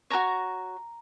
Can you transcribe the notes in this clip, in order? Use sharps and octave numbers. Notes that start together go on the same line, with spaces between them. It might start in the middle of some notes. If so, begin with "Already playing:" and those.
F#4 A#4 C#5 A#5